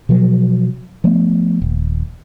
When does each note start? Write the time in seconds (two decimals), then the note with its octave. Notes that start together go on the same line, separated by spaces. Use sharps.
0.09 B2 F3 F#3
1.04 F3 A3 B3
1.62 D#1